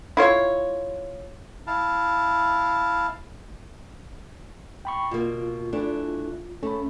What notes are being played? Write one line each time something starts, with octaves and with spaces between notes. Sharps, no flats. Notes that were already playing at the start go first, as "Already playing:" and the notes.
E4 F4 C#5
E4 F5 A5
G5 B5 C#6
B2 A#3 F4
E3 A3 D4
A3 C#4 B5